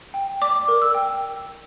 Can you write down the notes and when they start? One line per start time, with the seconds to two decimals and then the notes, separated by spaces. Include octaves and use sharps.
0.14 G5
0.41 D5 D6
0.68 A#4
0.82 E6
0.95 G5